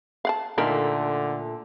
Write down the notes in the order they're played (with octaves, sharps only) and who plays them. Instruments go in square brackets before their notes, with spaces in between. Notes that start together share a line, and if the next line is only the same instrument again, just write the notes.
[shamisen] F5 F#5 A5
[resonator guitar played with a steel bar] A#2 A3 [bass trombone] D3 [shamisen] D#4 A#4